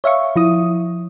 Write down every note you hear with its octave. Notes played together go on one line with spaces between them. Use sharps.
C#5 E5 F5 C#6
F3 E4 D#6